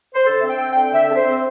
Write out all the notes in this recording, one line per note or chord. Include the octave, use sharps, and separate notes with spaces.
C5
D3 A4
C4 E5
G5
C4
D3 G5
D3 E5
C4 A4
C5
C4